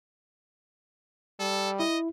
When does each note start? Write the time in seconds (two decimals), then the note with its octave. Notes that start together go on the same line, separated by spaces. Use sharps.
1.40 G3 A4
1.80 E4 D#5